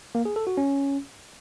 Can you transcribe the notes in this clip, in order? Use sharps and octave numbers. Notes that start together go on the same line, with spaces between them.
A#3
G#4
A4
F#4
C#4